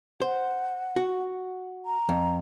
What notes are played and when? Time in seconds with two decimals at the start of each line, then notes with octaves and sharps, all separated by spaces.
0.22 C5 F#5
0.96 F#4
1.86 A#5
2.09 F2